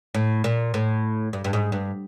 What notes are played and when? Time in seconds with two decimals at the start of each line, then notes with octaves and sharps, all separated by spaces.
0.15 A2
0.44 A#2
0.74 A2
1.33 G2
1.44 G2
1.53 G#2
1.72 G2